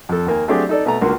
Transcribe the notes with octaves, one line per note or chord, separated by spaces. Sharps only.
F2 A4
D#2 A#3 G#5
F#3 A3 C4 D4 G4 G#4
D#4 A4 D5
B2 A3 A#5
C#2 D3 A#3 F#4 C6